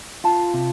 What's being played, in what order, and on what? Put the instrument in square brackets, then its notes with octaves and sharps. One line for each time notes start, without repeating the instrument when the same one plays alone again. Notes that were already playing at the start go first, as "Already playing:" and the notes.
[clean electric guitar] F4 [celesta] A5
[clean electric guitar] C3